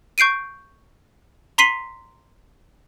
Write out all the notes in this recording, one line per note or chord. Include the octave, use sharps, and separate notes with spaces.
C#6 G6 C7 D7 D#7
A#5 C6 B6 C7 D#7 F#7